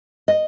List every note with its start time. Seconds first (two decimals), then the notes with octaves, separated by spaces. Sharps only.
0.28 D#5